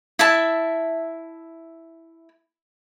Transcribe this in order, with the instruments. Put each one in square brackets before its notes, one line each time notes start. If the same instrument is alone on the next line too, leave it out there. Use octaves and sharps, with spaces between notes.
[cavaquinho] E4 E5 A5